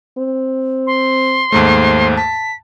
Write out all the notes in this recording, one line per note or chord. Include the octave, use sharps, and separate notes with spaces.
C4
C6
D#2 G#2 A3 C5
A5 B6